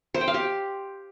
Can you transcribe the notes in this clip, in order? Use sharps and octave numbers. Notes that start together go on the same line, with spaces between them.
C5
G5
F5
G4